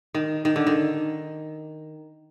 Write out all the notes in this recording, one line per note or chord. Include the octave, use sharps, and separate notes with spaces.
D#3
D#3
D3
D#3